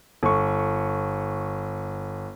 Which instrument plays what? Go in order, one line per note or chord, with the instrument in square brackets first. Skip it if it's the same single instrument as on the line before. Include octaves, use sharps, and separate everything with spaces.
[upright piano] G1 C#6